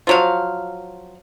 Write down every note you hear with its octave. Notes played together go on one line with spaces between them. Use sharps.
F3 F#3 F5